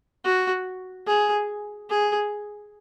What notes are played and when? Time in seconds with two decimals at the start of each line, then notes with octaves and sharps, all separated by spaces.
0.25 F#4
1.07 G#4
1.90 G#4